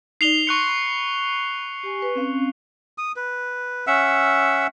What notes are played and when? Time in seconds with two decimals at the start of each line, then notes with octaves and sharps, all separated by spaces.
0.21 D#4 D5 C7 F7 G7
0.47 C6 C#6 F#6 C#7
0.68 B5
1.83 G4 G#5
2.02 B4
2.15 C4 C#4 F5
2.98 D#6
3.16 B4
3.87 C#4 E5 F#5 E6